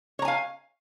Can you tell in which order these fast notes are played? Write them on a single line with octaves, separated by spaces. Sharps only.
C#5 A#5 G#5 F5